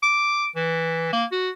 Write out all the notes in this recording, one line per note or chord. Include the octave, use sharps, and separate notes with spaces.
D6
E3
A#3
F#4